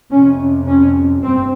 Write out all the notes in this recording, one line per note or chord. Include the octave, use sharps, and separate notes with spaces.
F2 C3 C#4
C#4
G2 C4